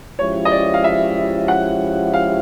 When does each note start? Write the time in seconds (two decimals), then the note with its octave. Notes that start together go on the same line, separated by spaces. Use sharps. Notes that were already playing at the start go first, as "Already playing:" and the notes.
0.19 F3 G#3 C#4 E4 G4 C#5
0.45 D#5
0.52 D5
0.74 F5
0.84 E5
1.48 F#5
2.14 F5